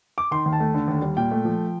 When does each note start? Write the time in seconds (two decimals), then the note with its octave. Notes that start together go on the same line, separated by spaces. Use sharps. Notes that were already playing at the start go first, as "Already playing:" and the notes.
0.18 D6
0.31 D#3 C6
0.46 D#2
0.53 A5
0.60 A3
0.75 D3
0.88 D#2
1.02 G3
1.17 A#2 G5
1.32 A3
1.45 F3